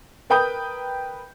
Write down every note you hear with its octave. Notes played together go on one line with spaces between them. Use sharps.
A#4 B4 G5 D#6 G6